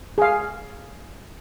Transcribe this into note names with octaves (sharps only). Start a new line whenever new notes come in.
G#4 F5